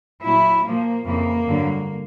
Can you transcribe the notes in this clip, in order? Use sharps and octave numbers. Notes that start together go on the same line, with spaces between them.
A#2 F#3 E4
A#2 F3 A#3
F2 C#3 E3 A#3
G2 D3 F#3